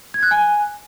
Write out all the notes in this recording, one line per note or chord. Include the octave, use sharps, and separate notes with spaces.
G#6
F#6
G#5